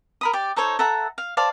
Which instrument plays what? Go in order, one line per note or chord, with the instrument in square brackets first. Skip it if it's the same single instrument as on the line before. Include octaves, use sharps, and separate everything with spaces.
[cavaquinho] A#4 B5 D#6
G4 D5
D#4 A4 C5 C#5
A4 E5 F#5 A#5
F5
C5 D5 F5 A5